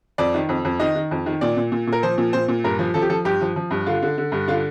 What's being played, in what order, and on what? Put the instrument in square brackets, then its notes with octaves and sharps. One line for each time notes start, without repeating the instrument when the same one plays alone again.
[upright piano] F2 D5
D#3
F2
F2
D#3 D#5
D#3
F2
D#3
A#2 D5
A#2
A#2
A#2
A#4
F3 C5
A#2
A#2 C5
A#2
G2 A#4
F3
F3 A4
G4
F3 A4
G2 G4
F3
F3
G2
D3 F4
D3
D3
G2
D3 F4